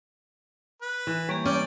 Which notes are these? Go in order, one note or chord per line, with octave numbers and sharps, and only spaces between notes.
B4
E3
G3 A#3 G4 C#5
C#4 D5 G5